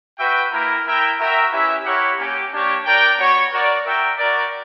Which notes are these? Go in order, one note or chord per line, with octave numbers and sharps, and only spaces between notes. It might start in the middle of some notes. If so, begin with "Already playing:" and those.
F#4 B4 E5 G5
A#3 E4 A#4
E4 A#4 E5 G5
F#4 A#4 E5 G5
C#4 E4 G4 B4 E5
E4 G4 A#4 C#5 F#5
A#3 C#4 G4
A#3 D4 G4 C#5
D4 A#4 D5 G5
B3 F#4 C#5
F#4 A#4 D5
F#4 A#4 E5 G5
F#4 A#4 D5